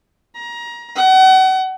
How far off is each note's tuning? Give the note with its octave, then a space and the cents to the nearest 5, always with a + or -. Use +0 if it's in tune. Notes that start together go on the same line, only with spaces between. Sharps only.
A#5 +25
F#5 +35